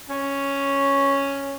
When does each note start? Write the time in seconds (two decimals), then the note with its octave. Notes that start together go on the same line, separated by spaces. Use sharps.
0.09 C#4